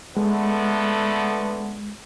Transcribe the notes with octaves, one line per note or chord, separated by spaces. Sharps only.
D3 G#3 A3 B3